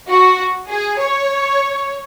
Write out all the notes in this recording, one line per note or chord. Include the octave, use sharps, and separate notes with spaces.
F#4
G#4
C#5